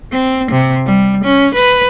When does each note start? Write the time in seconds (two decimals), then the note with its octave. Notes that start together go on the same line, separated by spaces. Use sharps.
0.12 C4
0.52 C3
0.86 G3
1.24 C#4
1.55 B4